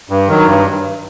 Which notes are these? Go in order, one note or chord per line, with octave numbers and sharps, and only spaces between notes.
G2
D#3 F#3
G2